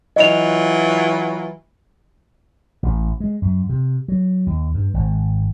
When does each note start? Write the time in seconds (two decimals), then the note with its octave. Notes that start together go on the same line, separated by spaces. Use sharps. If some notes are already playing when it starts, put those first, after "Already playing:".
0.16 E3 F#3 F4 D#5 F7
2.83 A1
3.20 G#3
3.42 F#2
3.69 C3
4.08 F#3
4.47 D#2
4.74 G2
4.94 G#1